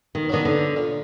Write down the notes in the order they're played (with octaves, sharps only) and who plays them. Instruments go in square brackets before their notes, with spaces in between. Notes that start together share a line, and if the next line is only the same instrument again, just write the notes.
[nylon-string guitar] D#3
[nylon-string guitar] D#3 [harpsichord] F#3 B3 D4
[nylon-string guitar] D3
[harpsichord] A#2